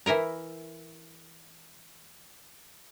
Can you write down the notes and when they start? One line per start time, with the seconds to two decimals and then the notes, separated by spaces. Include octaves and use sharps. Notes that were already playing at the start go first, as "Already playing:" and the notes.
0.06 E3 E4 A#4 A#5